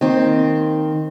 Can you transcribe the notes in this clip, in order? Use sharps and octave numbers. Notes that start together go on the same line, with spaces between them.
D#3 A#3 C4